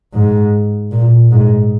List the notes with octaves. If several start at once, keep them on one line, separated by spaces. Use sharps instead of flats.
G#2
A#2
G#2